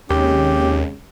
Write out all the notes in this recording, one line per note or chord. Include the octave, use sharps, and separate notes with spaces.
D#2 C3 G#3 C#4 G4